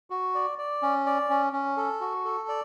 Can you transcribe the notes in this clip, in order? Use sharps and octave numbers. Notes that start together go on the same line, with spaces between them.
F#4
D5
D5
C#4
D5
C#4
C#4
A4
F#4
A4
D5